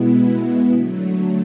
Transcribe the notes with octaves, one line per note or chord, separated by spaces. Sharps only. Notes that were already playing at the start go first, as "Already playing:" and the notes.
Already playing: B2 G#3 B3 E4
D3 F#3 A3